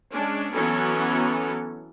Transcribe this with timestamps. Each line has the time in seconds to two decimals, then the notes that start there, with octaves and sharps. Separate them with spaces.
0.13 G#3 C#4 D4
0.54 E3 F#3 B3 C#4 A4